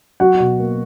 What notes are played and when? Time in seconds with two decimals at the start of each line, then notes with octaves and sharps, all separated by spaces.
0.20 F#3 F#4 F#5
0.40 B2
0.59 A#3